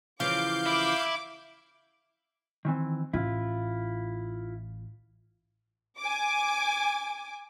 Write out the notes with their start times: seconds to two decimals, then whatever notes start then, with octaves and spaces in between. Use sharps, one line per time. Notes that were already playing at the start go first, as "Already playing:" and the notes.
0.20 C#3 E3 F3 F5 D6 G6
0.66 E4 D6
2.65 D#3 E3 C4
3.13 A1 E4 F4
6.00 G#5 D6